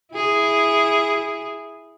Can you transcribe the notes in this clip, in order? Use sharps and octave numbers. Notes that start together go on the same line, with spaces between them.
E4 G#4